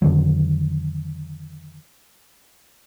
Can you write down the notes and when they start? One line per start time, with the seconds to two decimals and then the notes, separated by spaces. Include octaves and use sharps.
0.02 F2 D3 D#3 F#3